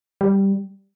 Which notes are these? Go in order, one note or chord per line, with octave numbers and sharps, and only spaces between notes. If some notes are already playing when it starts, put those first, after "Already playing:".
G3